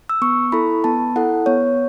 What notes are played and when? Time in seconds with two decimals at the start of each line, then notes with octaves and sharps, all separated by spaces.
0.09 E6
0.22 B3 C#6
0.52 E4 A4 B5
0.84 B3 A5
1.16 E4 A4 F#5
1.46 B3 C#5